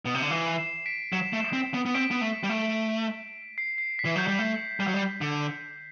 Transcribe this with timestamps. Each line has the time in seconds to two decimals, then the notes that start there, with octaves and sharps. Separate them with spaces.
0.05 B2
0.15 C3
0.22 D3
0.30 E3 C7
0.58 C7 E7
0.86 B6 D7
1.13 F#3 E7
1.33 A3
1.40 C7 E7
1.53 C4
1.74 B3
1.86 B3
1.94 C4 B6 D7
2.11 B3
2.21 A3
2.44 G3
2.49 A3
3.58 C7
3.78 C7
3.99 B6
4.05 E3
4.16 F#3 G6
4.28 G3
4.39 A3 G6
4.80 G3
4.87 F#3
4.94 G3
5.21 D3